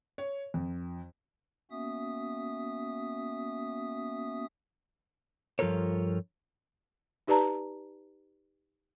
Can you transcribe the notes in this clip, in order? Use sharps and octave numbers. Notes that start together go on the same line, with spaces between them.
C#5
F2
A#3 B3 C#4 F#4 E5 D#6
G2 F3 F4 A4 A#4 C#5
D#4 G4 B4 D5 A5 A#5